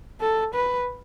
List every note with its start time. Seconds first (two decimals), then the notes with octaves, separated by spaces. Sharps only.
0.21 A4
0.54 B4